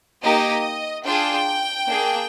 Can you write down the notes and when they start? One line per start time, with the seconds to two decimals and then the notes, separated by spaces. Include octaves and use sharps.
0.22 A#3 D#4 G4 D#5
1.05 D4 F4 G#4 G5
1.87 A#3 D4 G#4